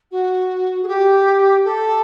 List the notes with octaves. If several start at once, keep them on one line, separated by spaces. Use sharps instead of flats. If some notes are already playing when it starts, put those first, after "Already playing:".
F#4
G#4
G4
A4